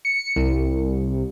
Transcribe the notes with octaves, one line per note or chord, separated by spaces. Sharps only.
C#7
C2